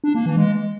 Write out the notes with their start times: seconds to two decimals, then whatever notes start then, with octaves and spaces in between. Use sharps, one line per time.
0.04 D4
0.15 A#3
0.26 E3
0.37 G#3